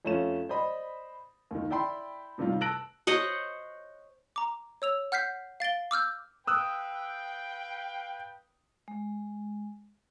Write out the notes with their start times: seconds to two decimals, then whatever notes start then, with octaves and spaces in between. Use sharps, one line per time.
0.05 F2 A3 C#4 F4 E7
0.49 C5 D5 D#5 B5
1.51 D#2 D#3
1.70 E4 D5 G5 B5 C6
2.38 A2 C3 D#3 G3 F4
2.61 A5 E6 F#6 A#6 D7 F#7
3.07 C5 C#5 D#5 F#5
4.36 A#5 D6
4.82 C#5 E6 F7
5.12 F#5 F6 G6 B6 C7
5.60 F5 A6 D7 G7
5.91 D6 E6 F6 G6
6.47 B4 F5 G5 D#6 E6 F#6
8.88 G#3